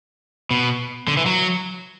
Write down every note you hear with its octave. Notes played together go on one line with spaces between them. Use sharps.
B2
D3
E3
F#3